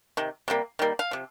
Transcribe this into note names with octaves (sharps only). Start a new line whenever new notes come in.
C3 D#3
C3 G3 A#3
D#3 G3 A#3
F5
C3 F3